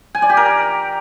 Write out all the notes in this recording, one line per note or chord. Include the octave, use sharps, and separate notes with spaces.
G#5
D5
G4
A#4